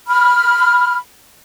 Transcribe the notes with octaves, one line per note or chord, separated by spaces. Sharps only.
B5 F6